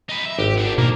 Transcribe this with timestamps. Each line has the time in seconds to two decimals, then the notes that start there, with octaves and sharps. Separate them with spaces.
0.09 D#4 B4
0.25 E5
0.39 G#1 G4
0.57 B3 D4
0.78 B2 F3 A#3 A#4